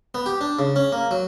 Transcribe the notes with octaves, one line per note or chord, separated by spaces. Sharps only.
B3
G4
D4
C#3
C#4
A#3
F#3